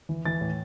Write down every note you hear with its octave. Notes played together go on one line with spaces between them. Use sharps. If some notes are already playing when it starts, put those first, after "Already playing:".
E3
E3 A6
A2